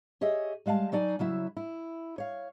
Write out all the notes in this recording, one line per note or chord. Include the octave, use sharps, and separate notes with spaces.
G4 G#4 C#5 D#5 E5
G3 G#3 F5 F#5 A5
F#3 D#4 D5 G5 G#5
C#3 F#3 E4 E5
E4
C#5 F5